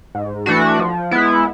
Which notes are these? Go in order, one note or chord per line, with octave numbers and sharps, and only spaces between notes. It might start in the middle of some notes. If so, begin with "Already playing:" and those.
G#2
E3 A3 D4 F#4
F3
G#3 B3 E4